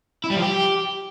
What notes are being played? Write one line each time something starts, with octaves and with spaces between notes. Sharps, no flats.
E4
G3
F3
G4